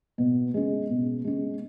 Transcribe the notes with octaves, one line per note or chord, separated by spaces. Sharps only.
B2
G#3 C#4
B2
G#3 C#4